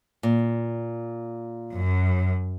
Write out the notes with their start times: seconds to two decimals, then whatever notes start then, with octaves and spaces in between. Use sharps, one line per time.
0.23 A#2
1.76 F#2